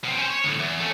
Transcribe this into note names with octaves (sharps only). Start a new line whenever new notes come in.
B2 C4
C#4 C5
C#5
D2 A2
E2
A3 C#4